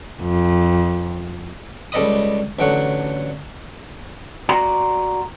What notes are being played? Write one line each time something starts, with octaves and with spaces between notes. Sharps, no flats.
F2
C#2 G3 A4 D#5 B5 D#6
A1 D3 F#3 F#5
F#4 D5 A#5 C6